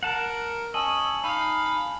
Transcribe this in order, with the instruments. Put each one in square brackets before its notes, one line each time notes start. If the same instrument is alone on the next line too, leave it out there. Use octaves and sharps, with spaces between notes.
[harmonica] A#4 [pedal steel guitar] F#5 A5
[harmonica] C#4 E6 [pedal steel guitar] D#5 [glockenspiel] G#5 A5 F#7
[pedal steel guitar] D#4 [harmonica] F5 [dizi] B5